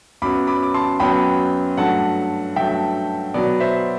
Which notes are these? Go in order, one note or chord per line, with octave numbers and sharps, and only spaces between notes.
F#2 F#3 B3 B5 D6
B5 D6
D6
A5 C6
F#2 F#3 B3 G5 B5
G2 F#3 A3 F#5 A5
G2 F#3 A3 E5 G5
B2 F#3 B3 D5
C5 E5